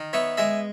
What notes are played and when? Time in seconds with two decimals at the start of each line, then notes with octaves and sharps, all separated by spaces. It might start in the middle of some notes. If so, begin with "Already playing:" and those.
Already playing: D#3
0.13 B3 C#5 E5
0.37 G#3 E5 G#5